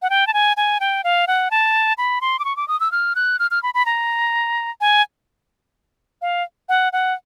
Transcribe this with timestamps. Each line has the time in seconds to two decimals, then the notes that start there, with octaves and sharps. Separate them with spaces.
0.02 F#5
0.10 G5
0.27 A5
0.34 G#5
0.57 G#5
0.80 G5
1.04 F5
1.27 F#5
1.51 A5
1.98 B5
2.21 C6
2.39 D6
2.45 C#6
2.57 D6
2.68 D#6
2.80 E6
2.92 F6
3.15 F#6
3.39 F6
3.51 F6
3.63 B5
3.74 B5
3.86 A#5
4.81 G#5
6.22 F5
6.69 F#5
6.93 F#5